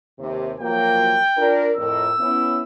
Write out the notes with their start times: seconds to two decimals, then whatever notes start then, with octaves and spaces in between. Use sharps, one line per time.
0.18 D#2 C3
0.60 F3 F#3 A#3 G5
1.37 D4 F4 A#4
1.76 F2 A2 A#4 E6
2.18 B3 C#4 E4